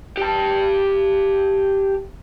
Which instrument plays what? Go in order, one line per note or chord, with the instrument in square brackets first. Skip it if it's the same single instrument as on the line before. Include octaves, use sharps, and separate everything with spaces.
[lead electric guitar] G4 A5